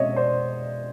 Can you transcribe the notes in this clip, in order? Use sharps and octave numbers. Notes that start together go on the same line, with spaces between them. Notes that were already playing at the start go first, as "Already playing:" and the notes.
Already playing: B2 G#3 C4 C#5 D#5 E5
C5 D5